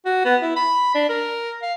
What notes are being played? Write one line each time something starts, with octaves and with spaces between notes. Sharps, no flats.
F#4
B3
E4
B5
D4
A#4
F5